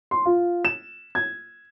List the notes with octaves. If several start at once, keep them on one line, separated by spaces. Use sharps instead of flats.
C6
F4
E7
G#6